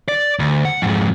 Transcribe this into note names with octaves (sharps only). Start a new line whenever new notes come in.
D5
D2
F#5
F2 G#2